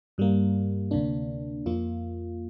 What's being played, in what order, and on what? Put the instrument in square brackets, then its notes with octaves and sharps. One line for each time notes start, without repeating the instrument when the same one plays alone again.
[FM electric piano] G2 G3 A#3
D2 C3 A#3 D4
F2 F3 A#3 F4